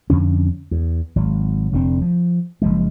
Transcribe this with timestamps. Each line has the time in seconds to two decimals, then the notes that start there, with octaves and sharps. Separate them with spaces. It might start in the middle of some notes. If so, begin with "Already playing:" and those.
0.10 F2 D3 C#4
0.71 E2
1.16 G#1 F#3
1.72 F1 D3 C4
2.01 F3
2.62 F#1 F3 G#3